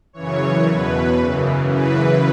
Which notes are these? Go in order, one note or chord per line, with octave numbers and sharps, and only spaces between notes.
F#2 C#3 E3 C#5
E2 B2 B4
F#2 C#3 E3
F#2 C#3 E3 B4